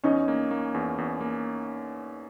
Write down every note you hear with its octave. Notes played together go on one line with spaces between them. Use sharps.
E2 C#4 D#4
A#3
A#3
E2
E2
A#3